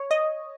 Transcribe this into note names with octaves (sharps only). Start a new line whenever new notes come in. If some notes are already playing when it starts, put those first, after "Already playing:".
Already playing: C#5
D#5